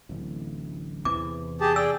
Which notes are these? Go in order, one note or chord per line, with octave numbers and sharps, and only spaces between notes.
D1 A1
E2 C3 E3 D6
G4 G#4 A5
G#4 D5 G5 E6